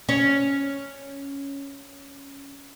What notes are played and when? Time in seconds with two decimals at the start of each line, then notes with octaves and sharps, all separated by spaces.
0.09 C#4 C#5